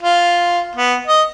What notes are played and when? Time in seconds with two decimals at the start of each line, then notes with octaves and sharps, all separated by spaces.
0.03 F4
0.76 B3
1.07 D#5